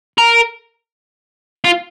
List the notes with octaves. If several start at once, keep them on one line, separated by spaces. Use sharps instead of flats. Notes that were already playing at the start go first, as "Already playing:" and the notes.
A#4
F4